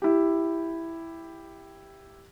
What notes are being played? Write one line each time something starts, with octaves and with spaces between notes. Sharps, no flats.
E4 G4